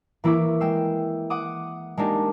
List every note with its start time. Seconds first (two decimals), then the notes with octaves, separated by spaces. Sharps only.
0.24 E3 A#3 E4 C#6 D6
0.60 G#3 G5 E6 C7
1.30 F#5 D6 D#6
1.97 G#3 A#3 D4 D#4 G4